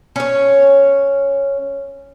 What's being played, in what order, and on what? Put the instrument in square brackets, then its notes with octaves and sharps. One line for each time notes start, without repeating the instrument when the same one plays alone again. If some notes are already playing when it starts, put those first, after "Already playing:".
[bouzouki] C#4 C#5